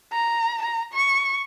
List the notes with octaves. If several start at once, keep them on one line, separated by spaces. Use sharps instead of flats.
A#5
A#5
C#6